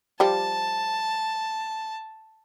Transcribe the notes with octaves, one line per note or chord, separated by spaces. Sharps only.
F3 G3 G4 A5